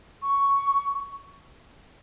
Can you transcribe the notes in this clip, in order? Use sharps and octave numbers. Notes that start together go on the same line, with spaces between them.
C#6